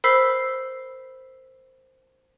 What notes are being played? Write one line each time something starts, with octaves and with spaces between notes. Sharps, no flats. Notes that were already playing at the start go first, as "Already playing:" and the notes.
A#4 C5 B5 E6 B6 C7